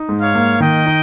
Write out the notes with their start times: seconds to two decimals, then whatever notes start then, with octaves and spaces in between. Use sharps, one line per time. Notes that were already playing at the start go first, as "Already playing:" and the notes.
Already playing: D#4
0.09 G#2
0.21 C#5 F5
0.35 A#3
0.60 D#3 D#5 G5
0.86 D#4